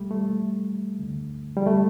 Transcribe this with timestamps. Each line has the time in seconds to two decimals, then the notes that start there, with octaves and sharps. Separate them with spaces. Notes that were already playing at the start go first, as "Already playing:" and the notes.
Already playing: C2 B2 G3 A3
0.11 A3
0.99 D2 D3
1.56 G3
1.66 A3